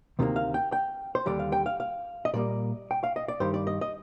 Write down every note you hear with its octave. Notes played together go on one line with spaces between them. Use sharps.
D2 C3 D#3 G3 A#3
F5
G5
G5
C5
D#2 D3 G3 D5
F5
G5
F5
F5
D#5
A#2 G3 A#3 D5
G5
F5
D#5
D5
G2 D#3 G3 C5
D5
D#5
D#5